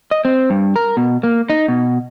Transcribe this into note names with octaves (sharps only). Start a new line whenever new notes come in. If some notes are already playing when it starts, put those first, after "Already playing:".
D#5
C4
G2
A#4
B2
A#3
D#4
B2